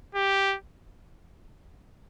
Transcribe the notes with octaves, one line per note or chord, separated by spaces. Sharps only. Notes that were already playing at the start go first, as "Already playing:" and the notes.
G4